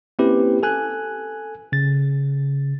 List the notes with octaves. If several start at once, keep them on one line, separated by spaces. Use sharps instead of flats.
A#3 C4 C#4 E4 G4 B4
A4 G#5 F#6
C#3 A6